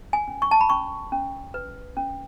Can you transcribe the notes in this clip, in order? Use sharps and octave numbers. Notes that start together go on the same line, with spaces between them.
G#5
C#4
C#6
A5
B5
C#4 C#6
C#4
B4
C#4